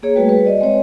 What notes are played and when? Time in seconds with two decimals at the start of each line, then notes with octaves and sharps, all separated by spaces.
0.03 A#3 G#4 C#5
0.15 G3 A3 F#4 B4 G5
0.29 B4
0.45 D5 D#5
0.61 G#3 C4 C#5 D#5